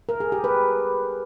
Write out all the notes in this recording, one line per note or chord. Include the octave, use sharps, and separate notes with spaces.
A#4
G#4
G4
B4